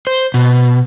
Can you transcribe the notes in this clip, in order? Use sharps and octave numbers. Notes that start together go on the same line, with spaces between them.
C5
B2